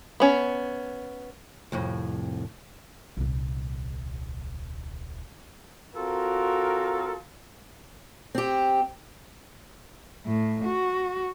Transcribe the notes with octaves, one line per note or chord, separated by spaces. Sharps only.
B3 C#4
C2 F2 A2
D#1 C2
C4 F4 F#4 A4 A#4
C4 G4
A2
F#4